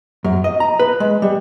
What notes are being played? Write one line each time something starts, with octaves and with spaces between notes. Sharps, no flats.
F#2
D#5
A#5
B4
G#3
G3